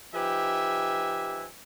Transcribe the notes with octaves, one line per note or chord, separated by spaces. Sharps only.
F3 D#4 G4 B4 E5 G#5